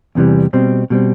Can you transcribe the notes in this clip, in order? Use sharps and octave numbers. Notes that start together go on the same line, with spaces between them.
E2 C3 E3 G3
B2 G3 C4
B2 G3 C4